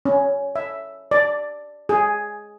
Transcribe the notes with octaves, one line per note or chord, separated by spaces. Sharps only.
C#4
E5
D5
G#4